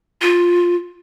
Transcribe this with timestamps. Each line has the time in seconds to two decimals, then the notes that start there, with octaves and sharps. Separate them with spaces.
0.22 F4